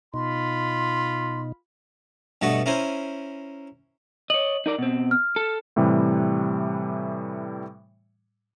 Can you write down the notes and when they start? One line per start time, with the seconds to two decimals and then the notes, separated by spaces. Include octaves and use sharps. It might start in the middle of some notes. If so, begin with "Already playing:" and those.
0.14 B2 D#4 F4 B5 C6
2.42 G2 B2 A3 D#5 F#5 C#6
2.66 C#4 E4 A#4 C5 G#5
4.30 C#5 D#5 F#7
4.66 D#4 A#4 D5
4.79 B2 C4
5.11 F6
5.36 A4
5.76 A2 C3 E3 G3